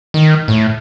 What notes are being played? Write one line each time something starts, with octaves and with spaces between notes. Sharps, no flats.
D#3
A2